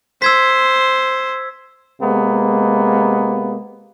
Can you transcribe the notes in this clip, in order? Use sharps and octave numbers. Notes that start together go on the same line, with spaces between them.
C5 E6 G#6 B6
C3 G#3 A#3 B3